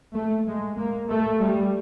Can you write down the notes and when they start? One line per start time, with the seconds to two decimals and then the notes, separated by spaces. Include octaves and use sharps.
0.13 A3
0.46 G#3
0.77 A#3
1.09 A3
1.39 G3